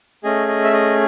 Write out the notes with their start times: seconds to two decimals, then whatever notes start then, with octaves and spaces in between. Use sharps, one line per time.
0.24 A3 C#4 G#4 D#5
0.48 D#5
0.64 E5
0.73 D#5